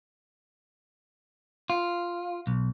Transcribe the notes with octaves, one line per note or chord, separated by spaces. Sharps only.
F4
B1